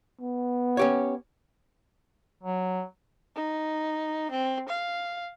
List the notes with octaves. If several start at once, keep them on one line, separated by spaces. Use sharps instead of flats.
B3
C#4 G4 C#5
F#3
D#4
C4
F5